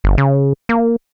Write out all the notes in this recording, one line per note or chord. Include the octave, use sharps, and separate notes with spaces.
G1
C#3
A#3